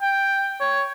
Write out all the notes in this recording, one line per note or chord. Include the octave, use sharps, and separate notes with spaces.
G5
C#5